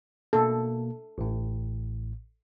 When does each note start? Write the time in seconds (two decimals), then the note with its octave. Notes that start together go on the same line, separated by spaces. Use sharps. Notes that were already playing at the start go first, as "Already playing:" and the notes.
0.33 B2 A#3 A4
1.18 A1 A2